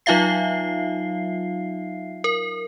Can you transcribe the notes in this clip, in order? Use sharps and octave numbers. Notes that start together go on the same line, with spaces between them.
F#3 D#4 F4 E5 F5 C7
A#4